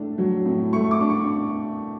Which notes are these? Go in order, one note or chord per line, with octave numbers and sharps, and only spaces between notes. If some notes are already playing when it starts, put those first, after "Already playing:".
Already playing: A2 A3 D4
F#3
A2
A3 C#6
D6
D4
C#6